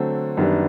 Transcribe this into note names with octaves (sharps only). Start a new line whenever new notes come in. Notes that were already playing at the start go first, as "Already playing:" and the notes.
Already playing: D3 F#3 A3 C4
F#2 D#3 G3 B3 D4